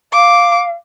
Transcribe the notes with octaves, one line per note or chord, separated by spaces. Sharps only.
F5 D6